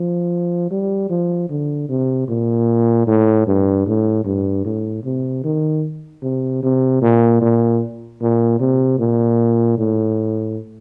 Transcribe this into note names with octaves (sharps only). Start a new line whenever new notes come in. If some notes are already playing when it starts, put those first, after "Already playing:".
Already playing: F3
G3
F3
D3
C3
A#2
A2
G2
A2
G2
A2
C3
D#3
C3
C3
A#2
A#2
A#2
C3
A#2
A2